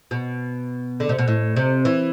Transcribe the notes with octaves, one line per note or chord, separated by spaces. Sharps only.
B2
D3
C3
B2
A2
C3
E3